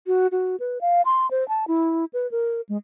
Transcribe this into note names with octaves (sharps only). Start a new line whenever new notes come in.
F#4
F#4
B4
F5
C6
C5
A5
E4
B4
A#4
G#3